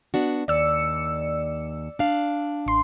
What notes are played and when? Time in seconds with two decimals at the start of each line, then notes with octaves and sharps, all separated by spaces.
0.14 B3 D4 F#4
0.48 D#2 D5 E6 C#7
1.99 D4 F5
2.66 A1 C6